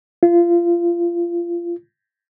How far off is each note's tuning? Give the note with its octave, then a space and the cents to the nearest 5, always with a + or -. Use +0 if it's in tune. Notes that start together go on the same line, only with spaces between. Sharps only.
F4 -25